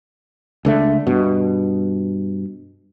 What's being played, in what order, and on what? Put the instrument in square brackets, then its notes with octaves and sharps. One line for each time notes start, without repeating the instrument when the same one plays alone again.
[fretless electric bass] C#2 D3 A3
G2 B2